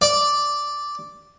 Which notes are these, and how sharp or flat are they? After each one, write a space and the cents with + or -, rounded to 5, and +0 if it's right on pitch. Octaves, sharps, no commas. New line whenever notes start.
D5 -5